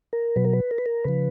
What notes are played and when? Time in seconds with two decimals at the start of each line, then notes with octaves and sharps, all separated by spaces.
0.13 A#4
0.36 B2 F#3 B4
0.45 A#4
0.53 B4
0.71 A#4
0.78 B4
0.86 A#4
1.04 C#3 F3 B4